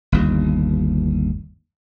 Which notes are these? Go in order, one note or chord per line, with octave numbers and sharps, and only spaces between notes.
G1 D#2